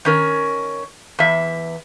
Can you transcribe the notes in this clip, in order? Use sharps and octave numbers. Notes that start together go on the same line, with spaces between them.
D#3 C#4 A#4
E2 E5